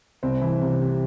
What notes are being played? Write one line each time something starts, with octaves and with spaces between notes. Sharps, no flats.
C2 C4
E3
C3
C3